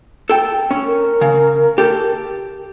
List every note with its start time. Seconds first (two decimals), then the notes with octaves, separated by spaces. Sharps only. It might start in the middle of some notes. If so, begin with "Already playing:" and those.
0.30 A4 G5
0.71 C#4
0.86 A#4
1.21 C#3
1.78 G4 A4